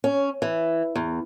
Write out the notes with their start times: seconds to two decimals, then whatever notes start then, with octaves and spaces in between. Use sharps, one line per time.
0.04 C#4
0.42 E3
0.96 E2